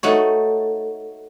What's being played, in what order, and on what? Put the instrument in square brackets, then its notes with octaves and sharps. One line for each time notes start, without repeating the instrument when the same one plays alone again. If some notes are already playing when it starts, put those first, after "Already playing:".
[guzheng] A3 D#4 F#4 C#5